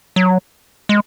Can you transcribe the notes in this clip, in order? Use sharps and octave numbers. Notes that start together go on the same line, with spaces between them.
F#3
G#3